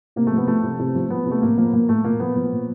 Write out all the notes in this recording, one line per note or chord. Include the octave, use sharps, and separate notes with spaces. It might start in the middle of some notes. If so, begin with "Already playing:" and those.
C3 A#3
A3
F3
B3
F3 A3
C3
C3
F3
F3 B3
C3
A3
A2 A#3
F3 A#3
F3 A#3
A2 A3
A#2 A#3
F3 B3
F3
A#2